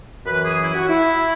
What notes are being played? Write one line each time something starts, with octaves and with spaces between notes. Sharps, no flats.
F#2 E3 B4
G#4
E4
F#4
E4